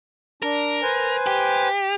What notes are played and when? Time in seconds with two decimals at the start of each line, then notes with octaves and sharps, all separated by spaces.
0.43 D4 A#4
0.83 B4 C5 G#5
1.27 G4